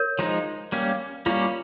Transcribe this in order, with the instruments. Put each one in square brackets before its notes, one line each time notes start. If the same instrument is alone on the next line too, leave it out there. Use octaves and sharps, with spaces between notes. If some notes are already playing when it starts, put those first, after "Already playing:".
Already playing: [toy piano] A#4 C#5
[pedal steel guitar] F3 G#3 D#4
G3 A#3 C#4
[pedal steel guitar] G3 A#3 C#4 [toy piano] F4